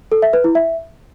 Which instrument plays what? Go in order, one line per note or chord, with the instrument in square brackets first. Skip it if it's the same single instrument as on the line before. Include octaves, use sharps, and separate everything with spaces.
[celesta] A4
E5
B4
E4
E5